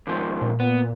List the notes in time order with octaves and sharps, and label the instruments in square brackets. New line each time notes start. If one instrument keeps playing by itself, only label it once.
[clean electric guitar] D#2 G#2 F3
[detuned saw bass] A#2
[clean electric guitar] B3